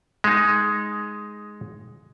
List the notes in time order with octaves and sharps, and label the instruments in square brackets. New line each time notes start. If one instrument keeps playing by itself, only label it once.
[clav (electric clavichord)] G#3 D#4